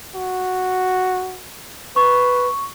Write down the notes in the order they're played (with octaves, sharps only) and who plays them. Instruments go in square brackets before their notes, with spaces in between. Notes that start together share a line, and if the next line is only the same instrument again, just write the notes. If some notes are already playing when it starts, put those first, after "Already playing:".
[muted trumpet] F#4
[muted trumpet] B4 [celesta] C#6